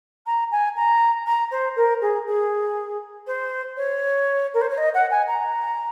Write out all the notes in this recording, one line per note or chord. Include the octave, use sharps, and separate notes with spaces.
A#5
G#5
A#5
A#5
C5
A#4
G#4
G#4
C5
C#5
A#4
C5
C#5
D#5
F#5
G#5
A#5